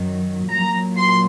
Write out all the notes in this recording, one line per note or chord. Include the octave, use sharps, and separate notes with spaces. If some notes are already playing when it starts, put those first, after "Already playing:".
Already playing: F#2 D#3 F#3
A#2 F#3 A#5
C6